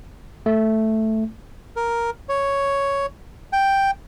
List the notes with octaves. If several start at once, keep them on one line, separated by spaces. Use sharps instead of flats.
A3
A#4
C#5
G5